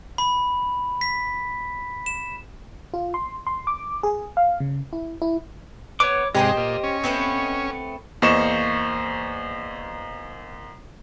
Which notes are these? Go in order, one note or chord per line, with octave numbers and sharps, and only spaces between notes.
B5
B6
E7
F4
C6
C6
D6
G#4
F5
C#3
E4
E4
B3 C#5 D6
G#2 C3 G#3 G4 A#4 C5 D#5
A#2
C#4
A3 B3 C4
E2 A#3 C5 D#5 C#6 E7